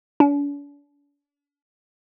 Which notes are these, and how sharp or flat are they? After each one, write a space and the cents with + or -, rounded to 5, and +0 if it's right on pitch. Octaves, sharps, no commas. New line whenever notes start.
D4 -45